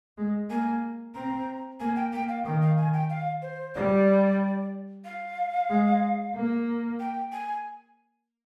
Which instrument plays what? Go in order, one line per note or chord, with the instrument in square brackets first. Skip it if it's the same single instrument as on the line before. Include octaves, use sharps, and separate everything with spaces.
[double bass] G#3
[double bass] A#3 [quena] G#5
[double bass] C4 [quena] A#5
[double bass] A#3 [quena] G#5
[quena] G5
[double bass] A#3 [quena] G5
[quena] F5
[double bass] D#3 [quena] G5
[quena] F5
G#5
G5
F5
C5
[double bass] G3 [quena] D5
[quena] F5
[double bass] G#3
A#3
[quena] G5
G#5